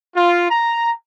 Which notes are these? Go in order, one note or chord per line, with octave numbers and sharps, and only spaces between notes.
F4
A#5